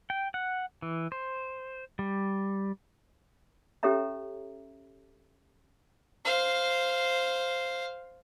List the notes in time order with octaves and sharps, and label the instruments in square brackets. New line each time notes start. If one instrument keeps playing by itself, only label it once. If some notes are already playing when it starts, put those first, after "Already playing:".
[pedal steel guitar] G5
F#5
E3
C5
G3
[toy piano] C#4 G4 A4 C#5 E5 A#5
[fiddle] C5 F5